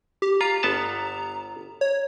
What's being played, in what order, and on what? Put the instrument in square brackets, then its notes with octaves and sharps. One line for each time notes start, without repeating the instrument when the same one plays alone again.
[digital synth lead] G4
[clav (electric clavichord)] F4 [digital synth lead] A#5
[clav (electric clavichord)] G1 B3 A5
[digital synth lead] C#5